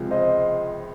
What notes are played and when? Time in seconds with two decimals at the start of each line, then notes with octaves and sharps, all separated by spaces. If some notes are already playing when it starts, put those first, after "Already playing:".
Already playing: C#2 C3 F3 G#3
0.11 C5 D#5